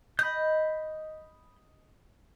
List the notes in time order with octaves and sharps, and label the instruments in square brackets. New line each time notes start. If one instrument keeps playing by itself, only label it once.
[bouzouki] D#5 [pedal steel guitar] B5 G6